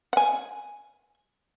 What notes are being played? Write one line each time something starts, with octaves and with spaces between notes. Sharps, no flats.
F#5 G#5